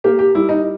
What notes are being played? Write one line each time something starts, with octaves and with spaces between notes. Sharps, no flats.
A#3 G4
G4
G3 E4
D#4